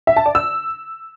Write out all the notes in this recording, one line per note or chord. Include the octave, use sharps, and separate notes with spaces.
E5
A5
D5
E6